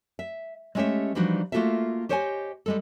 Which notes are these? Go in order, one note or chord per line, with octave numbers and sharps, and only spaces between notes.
E5
G#3 A3 C#4 G4 C#5 E5
E3 F3 G3 D4 D#4 F#4
A3 A#3 F4 F#4 A4 E5
G4 C5 C#5 D#5 E5 G#5
G3 G#3 A4